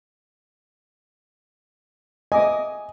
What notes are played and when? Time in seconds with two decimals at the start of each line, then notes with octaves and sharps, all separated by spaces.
2.32 D#5 E5 G#5 D6